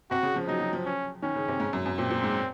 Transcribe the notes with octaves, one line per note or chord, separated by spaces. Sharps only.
C3 F#4
C#3
F3
F#3 D#4
F#3
F3
C#4
D#3 C#4
C#3
C3
G#2
F#2
F#2
A#2 C4
A#2
G#2